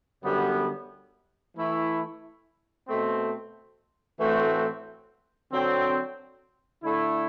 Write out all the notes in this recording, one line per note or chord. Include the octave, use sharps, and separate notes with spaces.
F#2 D3 G3 B3
E3 A3 E4
B2 A3 C4
A2 E3 A3 C4 F#4
D3 F#3 C4
D3 A3 E4